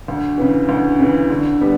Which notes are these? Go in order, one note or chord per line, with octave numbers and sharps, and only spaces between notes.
D2
C#3 E3
D2
C#3 E3
D3
G3 B3